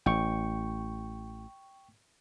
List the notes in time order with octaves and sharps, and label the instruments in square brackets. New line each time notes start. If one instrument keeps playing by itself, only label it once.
[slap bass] A1 [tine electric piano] G5 C#6